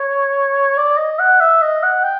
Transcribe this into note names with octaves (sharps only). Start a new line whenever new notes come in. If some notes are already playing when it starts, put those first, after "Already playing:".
Already playing: C#5
D5
D#5
F#5
E5
D#5
F#5
G5